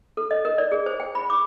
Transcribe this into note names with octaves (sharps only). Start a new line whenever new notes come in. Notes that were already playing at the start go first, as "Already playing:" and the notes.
A4
D#5
A#4
D5
G#4
C5
G5
B5
D6